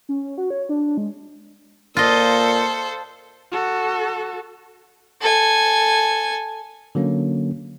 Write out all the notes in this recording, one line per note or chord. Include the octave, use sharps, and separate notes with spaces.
C#4
F#4
C#5
D4
G#3
A#2 F4 A4 C5 D#5
F#4 A4
A4 G#5
D3 F#3 A#3 C#4